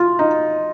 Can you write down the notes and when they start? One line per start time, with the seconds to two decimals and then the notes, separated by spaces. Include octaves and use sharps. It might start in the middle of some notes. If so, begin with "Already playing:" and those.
Already playing: F4
0.19 D#4